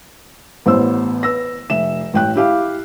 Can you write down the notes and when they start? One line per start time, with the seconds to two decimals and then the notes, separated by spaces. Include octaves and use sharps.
0.66 A1 B3 C5 E6
1.23 B4 E6 A#6
1.70 F1 E5 E7
2.14 A1 G5 F#6
2.36 E4 G4 F5